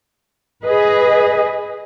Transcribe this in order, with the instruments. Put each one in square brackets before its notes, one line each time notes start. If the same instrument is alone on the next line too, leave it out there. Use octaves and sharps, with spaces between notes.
[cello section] G#4 B4 D#5